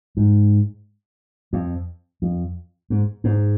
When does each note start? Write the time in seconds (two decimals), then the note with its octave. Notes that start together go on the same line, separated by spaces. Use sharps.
0.17 G#2
1.53 F2
2.22 F2
2.90 G#2
3.24 G#2